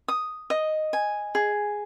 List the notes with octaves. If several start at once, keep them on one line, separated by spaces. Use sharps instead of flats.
D#6
D#5
G#5
G#4